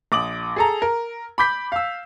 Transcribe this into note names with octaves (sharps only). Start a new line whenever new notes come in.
A#1 D6 D#6 F#7
G#4 A4 A#5
A#4
B5 D6 G6 B6
F5 E6